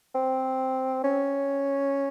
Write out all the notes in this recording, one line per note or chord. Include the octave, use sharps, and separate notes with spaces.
C4
C#4